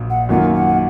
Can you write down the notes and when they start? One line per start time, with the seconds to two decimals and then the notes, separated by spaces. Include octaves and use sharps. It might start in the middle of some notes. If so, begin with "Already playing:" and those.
Already playing: A#1 A#2 F#3
0.10 F#5
0.29 F#2 D#3 A#3 F4 F#5
0.54 F#5